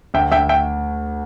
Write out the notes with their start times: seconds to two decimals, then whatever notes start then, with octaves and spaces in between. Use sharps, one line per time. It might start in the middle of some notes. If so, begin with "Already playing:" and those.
0.14 D2 E5 G5
0.32 D2 E5 G5
0.49 E5 G5